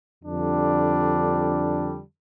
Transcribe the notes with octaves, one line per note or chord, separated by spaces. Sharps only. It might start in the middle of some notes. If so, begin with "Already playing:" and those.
F2 D3 G3 D4